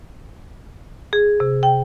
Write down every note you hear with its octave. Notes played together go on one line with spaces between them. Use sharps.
G#4
C3
G5